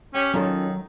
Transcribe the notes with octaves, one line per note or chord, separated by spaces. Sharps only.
C#4 G4 G5
D#3 F#3 C#4 F4 A4